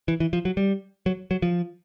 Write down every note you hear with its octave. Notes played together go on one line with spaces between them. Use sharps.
E3
E3
F3
F#3
G3
F#3
F#3
F3